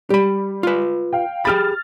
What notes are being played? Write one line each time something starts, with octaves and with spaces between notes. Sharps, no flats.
G3 G4 B5
F4 B4
F5 G5
G4 G#4 B5 F6 A6